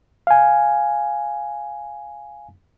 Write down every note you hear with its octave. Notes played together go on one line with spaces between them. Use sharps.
F5 G#5